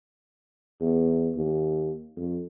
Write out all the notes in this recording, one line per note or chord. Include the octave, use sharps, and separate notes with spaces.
E2
D#2
F2